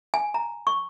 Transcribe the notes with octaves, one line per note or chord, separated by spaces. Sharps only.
G#5
A#5
C#6